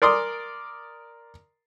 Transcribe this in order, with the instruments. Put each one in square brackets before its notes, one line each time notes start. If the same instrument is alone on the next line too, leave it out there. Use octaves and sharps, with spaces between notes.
[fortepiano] A#4 D5 C6 D#6